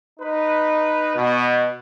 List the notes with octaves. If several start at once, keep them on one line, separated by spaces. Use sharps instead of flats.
D#4 B4
B2